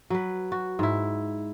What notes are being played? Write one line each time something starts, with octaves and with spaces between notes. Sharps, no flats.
F#3 B4
F#4
G#2 E4